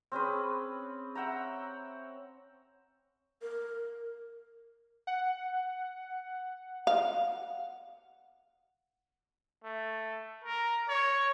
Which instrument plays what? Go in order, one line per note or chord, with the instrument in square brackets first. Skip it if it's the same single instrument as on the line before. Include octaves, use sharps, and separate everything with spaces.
[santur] C4 C#4 G#4 B4
E5 F#5 G5 A#5
[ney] A#4
[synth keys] F#5
[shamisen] F5
[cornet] A3
A#4
C#5